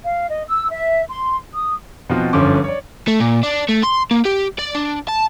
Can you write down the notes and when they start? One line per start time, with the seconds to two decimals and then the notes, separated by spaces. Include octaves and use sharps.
0.04 F5
0.29 D#5
0.48 E6
0.70 E5
1.09 C6
1.53 D#6
2.10 B2 F3 C4 D#4 F4 F#4
2.33 G1 F#2 D3 F3 C#4 D6
2.64 C#5 D5
3.08 A3
3.20 A#2
3.43 D4
3.69 A3
3.83 C6
4.11 A#3
4.25 G4
4.59 D5
4.75 D4
5.08 A5